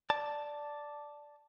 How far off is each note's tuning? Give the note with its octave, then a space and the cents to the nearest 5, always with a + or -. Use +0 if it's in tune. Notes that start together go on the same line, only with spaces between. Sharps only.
D5 +0 A5 +0